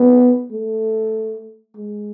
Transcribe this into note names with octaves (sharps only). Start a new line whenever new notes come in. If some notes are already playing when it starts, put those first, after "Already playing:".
Already playing: B3
A3
G#3